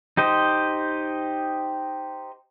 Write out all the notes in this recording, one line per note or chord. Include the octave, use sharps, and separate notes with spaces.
D#4 G4 C5 D#5